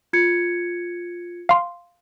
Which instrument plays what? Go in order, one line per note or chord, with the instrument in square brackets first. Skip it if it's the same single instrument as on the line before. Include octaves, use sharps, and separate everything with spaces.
[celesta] F4 G#6 C#7
[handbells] F5 C6